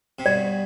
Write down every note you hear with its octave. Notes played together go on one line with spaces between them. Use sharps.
C3
G2 B2 D5